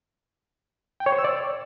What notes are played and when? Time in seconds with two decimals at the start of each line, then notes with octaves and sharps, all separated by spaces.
1.00 G5
1.06 C#5
1.12 C5
1.18 E6
1.24 D5